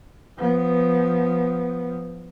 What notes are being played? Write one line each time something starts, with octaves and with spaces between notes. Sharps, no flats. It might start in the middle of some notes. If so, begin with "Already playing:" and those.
F3 B3